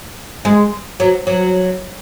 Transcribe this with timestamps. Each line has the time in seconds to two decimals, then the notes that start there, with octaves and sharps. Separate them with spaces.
0.45 G#3
1.00 F#3
1.27 F#3